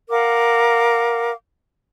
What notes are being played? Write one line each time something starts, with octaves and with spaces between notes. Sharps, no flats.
A#4 F5 F#5 D6